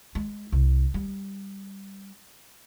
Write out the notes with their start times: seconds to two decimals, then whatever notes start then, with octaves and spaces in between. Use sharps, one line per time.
0.15 G#3
0.52 C2
0.94 G3